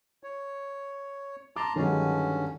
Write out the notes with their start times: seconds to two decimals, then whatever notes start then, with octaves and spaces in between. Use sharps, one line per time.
0.23 C#5
1.56 A5 A#5 C6 D6
1.76 G2 D3 D#3 F#3 G#3 C#4